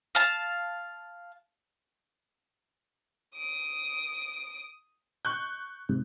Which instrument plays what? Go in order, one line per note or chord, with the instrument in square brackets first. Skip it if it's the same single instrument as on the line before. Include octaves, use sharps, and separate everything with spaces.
[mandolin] F5 A5
[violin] D#6 D7
[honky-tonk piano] C#6 F#6 G6
[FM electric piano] G#2 C3